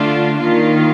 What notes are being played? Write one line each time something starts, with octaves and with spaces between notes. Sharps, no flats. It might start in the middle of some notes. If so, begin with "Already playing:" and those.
Already playing: D3 A3 D4 F4
D#3 A#3 F4